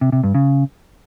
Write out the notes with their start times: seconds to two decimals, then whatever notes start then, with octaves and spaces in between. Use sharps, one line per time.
0.01 C3
0.12 C3
0.23 G2
0.35 C#3